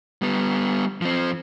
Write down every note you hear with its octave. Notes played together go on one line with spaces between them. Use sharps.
G3 B3
F3 C4